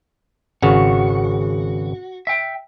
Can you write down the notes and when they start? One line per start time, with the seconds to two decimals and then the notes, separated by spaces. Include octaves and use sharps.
0.62 G#1 C#3 F#4
2.27 E5 G5